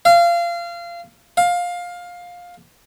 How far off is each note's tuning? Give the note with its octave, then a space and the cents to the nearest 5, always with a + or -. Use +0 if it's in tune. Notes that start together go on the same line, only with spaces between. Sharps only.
F5 -25
F5 +15